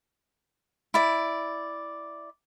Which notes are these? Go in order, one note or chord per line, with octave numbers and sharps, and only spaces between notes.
E4 D5